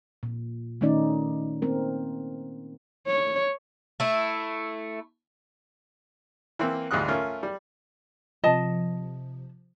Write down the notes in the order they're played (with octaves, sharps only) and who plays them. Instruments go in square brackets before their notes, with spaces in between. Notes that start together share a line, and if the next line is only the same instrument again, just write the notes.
[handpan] A#2
D#3 A3 C#4 D#4 D5
A#3 C4 A#4
[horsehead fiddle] C#5
[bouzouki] A3 E4
[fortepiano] E3 A#3 C4
D2 G#2 G3 F4 D#5 F#6
A3 C#4 F4 A#4
G3
[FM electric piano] C3 F3 [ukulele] D#5 A5